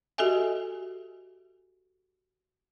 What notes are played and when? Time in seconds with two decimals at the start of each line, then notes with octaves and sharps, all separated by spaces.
0.18 F#4 G4 A4 D#5 E5 G#5